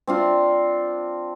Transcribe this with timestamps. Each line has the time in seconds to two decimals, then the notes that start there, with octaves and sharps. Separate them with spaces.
0.07 C4 D4 F4